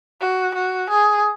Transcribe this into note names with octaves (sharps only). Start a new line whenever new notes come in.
F#4
F#4
G#4